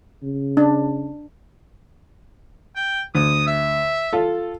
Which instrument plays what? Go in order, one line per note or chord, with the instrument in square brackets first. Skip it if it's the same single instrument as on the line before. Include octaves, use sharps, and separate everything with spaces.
[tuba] C#3
[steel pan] D4
[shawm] G5
[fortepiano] D2 [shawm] D#6
[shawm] E5
[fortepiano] F4 A4